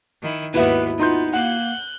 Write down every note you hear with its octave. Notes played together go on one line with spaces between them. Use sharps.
D#3 E4
D#2 G#2 B3 E4 F#4 B4 E5
B3 D#4 F4 C6 G6
A#3 F#5 F#6 G6